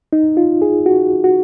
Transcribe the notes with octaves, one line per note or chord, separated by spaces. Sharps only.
D#4
F4
G#4
F#4
F#4